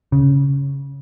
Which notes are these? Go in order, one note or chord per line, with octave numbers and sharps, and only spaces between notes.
C#3